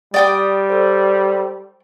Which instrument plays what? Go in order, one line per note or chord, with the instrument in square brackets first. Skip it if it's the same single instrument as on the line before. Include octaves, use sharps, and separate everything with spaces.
[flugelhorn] G3 [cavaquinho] D5 G5 D6 [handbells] D#6
[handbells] A4 C5